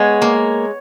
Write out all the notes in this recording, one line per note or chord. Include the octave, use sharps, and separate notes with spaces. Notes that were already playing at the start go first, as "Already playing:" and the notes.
Already playing: G#3 B3 C#5
A#3